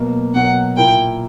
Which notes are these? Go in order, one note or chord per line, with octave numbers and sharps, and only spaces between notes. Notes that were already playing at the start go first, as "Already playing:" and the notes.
Already playing: B2 F#3 A#3
B2 F#3 A#3 F#5
A#2 A#3 E4 G5